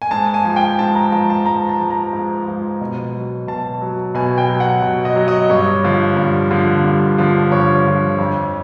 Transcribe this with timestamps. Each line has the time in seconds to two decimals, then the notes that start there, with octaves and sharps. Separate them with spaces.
0.02 G#5
0.11 G#2 A5
0.34 G#5
0.45 F3
0.56 G5
0.79 G#2 A5
0.95 A#5
1.12 F3 A5
1.30 A5
1.46 G#2 A#5
1.69 A5
1.80 F3
1.91 A#5
2.13 G#2
2.48 F3
2.81 B2
3.15 F#3
3.47 B2 A5
3.82 F#3
4.15 B2 G#5
4.38 G5
4.49 F#3
4.60 F#5
4.82 B2
5.05 D#5
5.16 F#3
5.28 D#5
5.50 G2 C#5
5.84 D3 F3
6.17 G2
6.51 D3 F3
6.84 G2
7.18 D3 F3
7.51 G2 C#5
7.85 D3 F3
8.18 F2